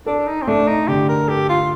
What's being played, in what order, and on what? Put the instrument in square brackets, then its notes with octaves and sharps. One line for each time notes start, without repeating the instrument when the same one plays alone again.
[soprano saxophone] D4 [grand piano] A4
[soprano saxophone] D#4
C4
[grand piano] A3 [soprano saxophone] D4
[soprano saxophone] D#4
[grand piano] D3 [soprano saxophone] G4
[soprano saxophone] A#4
[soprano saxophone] G4 [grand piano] A4
[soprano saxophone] F4